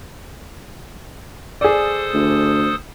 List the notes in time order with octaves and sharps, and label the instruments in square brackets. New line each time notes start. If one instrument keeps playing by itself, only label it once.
[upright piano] G#4 D5 [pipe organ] A4 C5 D#6
[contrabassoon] D2